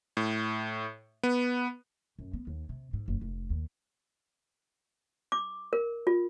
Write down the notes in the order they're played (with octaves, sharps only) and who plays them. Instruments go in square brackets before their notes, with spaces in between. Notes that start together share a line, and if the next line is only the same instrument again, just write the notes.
[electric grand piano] A2
B3
[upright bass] F#2
B3
D#2
C3
G#2
F#1
F1
D#2
[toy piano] D6
A#4
F4